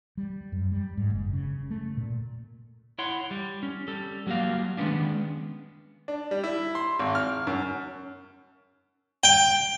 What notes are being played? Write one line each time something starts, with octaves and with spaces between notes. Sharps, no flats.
G3
F#2
G3
G#2
F#1
C#3
A3
A#2
E4 C#5 F#5 C6
G3
C#4
G3 A4
F#3 G3 A#3 F#4 F5
D#3 G#3 A3 B3 C#4 D4
D4
G3
E4
C6
G#1
F6
F#2
G5